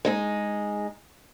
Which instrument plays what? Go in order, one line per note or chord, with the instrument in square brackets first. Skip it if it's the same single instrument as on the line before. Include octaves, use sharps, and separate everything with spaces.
[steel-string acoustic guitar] G#3 D#4 G#4